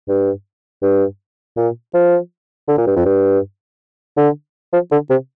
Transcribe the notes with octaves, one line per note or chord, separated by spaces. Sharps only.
G2
G2
A#2
F3
D3
A#2
G2
F2
G2
D3
F3
D3
C3